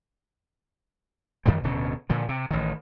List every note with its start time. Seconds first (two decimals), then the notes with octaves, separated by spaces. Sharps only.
1.46 F#2 D#3 F3 G3
1.64 D1 B2 D3 C#4
2.09 A#2 D3 F3
2.29 C3
2.51 A1 D#3